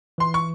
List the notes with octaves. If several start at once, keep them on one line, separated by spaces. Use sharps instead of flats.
E3 C6
C#6